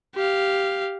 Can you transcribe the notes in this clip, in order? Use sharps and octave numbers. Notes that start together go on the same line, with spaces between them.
G4 F5